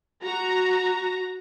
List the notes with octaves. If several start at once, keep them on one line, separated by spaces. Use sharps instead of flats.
F#4 A#5